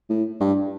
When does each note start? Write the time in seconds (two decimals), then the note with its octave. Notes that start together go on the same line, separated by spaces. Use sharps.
0.10 A2
0.40 G2